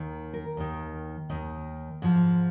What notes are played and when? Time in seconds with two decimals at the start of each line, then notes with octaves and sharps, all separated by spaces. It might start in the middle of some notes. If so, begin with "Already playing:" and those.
Already playing: D#2 D#3
0.33 A#4
0.57 D#2 D#3
1.30 D#2 D#3
2.02 G#2 F3